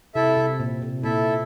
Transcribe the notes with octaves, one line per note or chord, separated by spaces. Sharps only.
C3 E4 A4 E5
C3
A#2
C3
A#2 E4 A4 E5